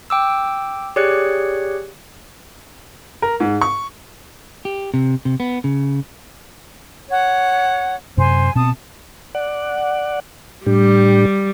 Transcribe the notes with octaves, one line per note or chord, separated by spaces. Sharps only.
G5 D6 E6
G4 G#4 C#5 D5 F#6 C#7
A#4
G#2
C#6
G4
C3
C3
B3
C#3
C#5 F#5
F#2 C3 C5 G#5
B2 C4 A5 D#6
D5 F#5
A2 G3 D4 G4